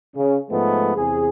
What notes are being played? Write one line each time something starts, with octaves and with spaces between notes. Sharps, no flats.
C#3
G#2 F3 G#3 A3 B3
E2 C3 G#4